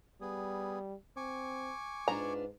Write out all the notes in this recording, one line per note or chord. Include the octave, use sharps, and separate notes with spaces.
G3 B3 G#4
C4 G#5 C#6 D6
G#2 D4 F4 B4 A#5